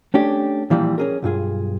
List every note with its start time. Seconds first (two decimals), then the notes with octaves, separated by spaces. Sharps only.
0.14 A3 C#4 D4 G4
0.70 A#2 E3 F3 G3
0.98 C#4 G#4 A#4
1.22 B1 G2 F4 G#4